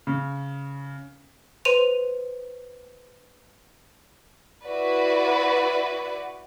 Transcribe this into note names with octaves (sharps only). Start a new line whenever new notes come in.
C#3
B4 C5 C6 D#7 F7
E4 F#4 B4 D5